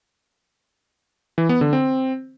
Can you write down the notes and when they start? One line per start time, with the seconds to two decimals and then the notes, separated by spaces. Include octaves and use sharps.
1.38 E3
1.49 B3
1.61 D3
1.73 C4